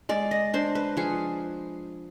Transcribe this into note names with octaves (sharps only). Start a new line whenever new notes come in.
G#3 D5
D#5
D4 C5
B4
F3 G#4